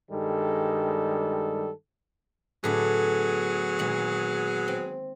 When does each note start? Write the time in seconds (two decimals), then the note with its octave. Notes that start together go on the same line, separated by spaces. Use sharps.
0.11 G2 D#3 G3 G#3 A4
2.64 A2 D3 F#3 A3 B3 G#4
3.79 A#2 D#3 G#3
4.68 C4